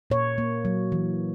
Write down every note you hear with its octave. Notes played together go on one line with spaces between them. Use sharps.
A#2 C#5
A#3
F#3
E3